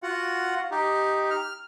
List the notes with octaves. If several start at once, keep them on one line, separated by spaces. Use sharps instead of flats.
F4 F#4 F#5
D#4 G4
F6